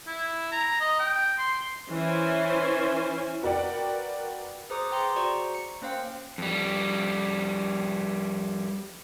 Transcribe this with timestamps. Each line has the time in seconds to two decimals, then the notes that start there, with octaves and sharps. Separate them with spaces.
0.07 E4
0.52 A#5
0.81 D#5
0.99 G5
1.39 C6
1.89 E3 C#4 E4 C5 G#5
3.43 F#4 A#4 B4 D5 F#5 G5
4.70 G#4 B4 C5 A#5 D6 D#6
4.91 G#4 G5 A#5 C6 C#7
5.16 F#4 C5 D5 A#5 C#6
5.55 C#7
5.82 A#3 C#4 C5 F5 G5
6.38 F2 G3